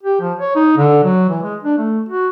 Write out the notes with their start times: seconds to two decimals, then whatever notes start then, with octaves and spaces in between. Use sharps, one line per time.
0.03 G4
0.20 F3
0.39 C#5
0.55 D#4
0.77 D3
1.04 F#3
1.29 E3
1.43 G#3
1.63 D4
1.78 A3
2.09 F#4